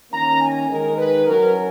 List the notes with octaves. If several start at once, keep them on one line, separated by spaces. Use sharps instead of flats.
D#3 A#3 C#4 A#5
G#5
D#3 G#3 D#4 A#4
B4
F#3 C#4 E4 A#4